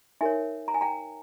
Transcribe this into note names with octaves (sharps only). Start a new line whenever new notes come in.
D#4 A#4 C#5 E5 G#5
A#5
G#5
G5 A#5